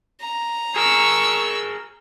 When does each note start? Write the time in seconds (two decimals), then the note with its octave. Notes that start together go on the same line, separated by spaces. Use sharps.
0.21 A#5
0.76 G#4 A#4 C#6 E6